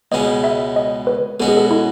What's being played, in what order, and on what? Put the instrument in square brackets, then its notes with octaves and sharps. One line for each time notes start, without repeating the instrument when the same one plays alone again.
[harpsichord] C#2 B2 G#3 C#4 [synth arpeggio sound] D#5
[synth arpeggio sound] E5
D#5
B4
[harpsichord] B2 G#3 C#4 F#4 [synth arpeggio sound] A4
[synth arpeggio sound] G#4
A4
E4